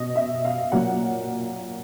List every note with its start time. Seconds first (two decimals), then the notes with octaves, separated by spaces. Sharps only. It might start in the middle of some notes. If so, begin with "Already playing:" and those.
Already playing: B2 D#5
0.15 E5
0.45 F5
0.72 A#2 F#3 A#3 F#5